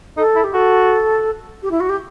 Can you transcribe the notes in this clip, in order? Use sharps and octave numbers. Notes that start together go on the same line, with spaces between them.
D#4 A4
E4
G4
F#4 A4
G4
E4
F#4
G4